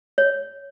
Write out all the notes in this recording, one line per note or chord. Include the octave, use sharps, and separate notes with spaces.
C#5